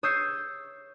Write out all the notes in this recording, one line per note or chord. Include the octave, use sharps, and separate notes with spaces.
C#5 D#6 E6 G6 C7 C#7